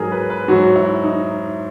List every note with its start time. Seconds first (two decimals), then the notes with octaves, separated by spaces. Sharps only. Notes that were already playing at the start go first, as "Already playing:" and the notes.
Already playing: G#2 F#3 G#4 A#4
0.12 B4
0.30 B4
0.48 G#2 F#3 F#4
0.76 E4
1.03 D#4